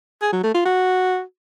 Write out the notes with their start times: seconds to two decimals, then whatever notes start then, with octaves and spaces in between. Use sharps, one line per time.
0.22 G#4
0.33 F#3
0.43 A3
0.54 F4
0.65 F#4